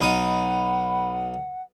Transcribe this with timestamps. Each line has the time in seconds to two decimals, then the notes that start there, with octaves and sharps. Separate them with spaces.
0.01 B1 D#4 F#5 B5 D#6